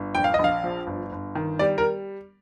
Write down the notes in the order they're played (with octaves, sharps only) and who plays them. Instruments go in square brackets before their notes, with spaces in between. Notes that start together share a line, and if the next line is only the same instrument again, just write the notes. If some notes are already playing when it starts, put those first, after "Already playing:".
Already playing: [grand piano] G1
A#1 G5
F5
D#5
A#1 F5
F3
G1
G1
D#3
G3 D5
A#4